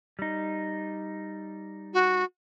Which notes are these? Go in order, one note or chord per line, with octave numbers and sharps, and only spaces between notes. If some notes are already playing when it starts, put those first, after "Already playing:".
G3 D#4
F#4